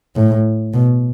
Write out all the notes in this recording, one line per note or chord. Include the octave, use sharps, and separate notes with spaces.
A2
B2